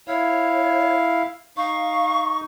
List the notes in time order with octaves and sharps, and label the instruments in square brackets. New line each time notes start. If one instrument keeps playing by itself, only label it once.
[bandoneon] E4 F5 [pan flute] C#5
[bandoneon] D#4 [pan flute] F5 [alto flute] C#6